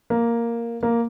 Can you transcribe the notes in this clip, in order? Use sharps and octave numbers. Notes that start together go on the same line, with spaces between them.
A#3
A#3